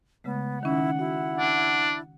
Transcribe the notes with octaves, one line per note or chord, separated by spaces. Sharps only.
C#3 G#3 A3 B3
D#3 C#4 D#4 E4 F#5
E4 F#4
D4